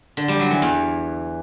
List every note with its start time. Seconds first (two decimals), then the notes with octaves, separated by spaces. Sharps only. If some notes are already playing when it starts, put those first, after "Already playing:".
0.17 D3
0.28 G3
0.40 F#3
0.51 E3
0.62 E2